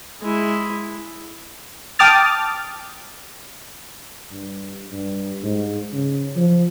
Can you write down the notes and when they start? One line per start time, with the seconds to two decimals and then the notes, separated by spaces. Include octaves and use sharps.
0.21 G#3 E4
1.99 G5 A5 D6 D#6 F6 A6
4.31 G2
4.92 G2
5.44 G#2
5.93 C#3
6.36 F3